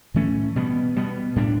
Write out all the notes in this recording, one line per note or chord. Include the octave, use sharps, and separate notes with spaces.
A2 E3 A3 C#4
B2 G3 B3
B2 G3 B3
A2 G3 D4